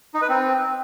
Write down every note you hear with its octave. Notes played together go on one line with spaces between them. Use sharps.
D#4
B4
C4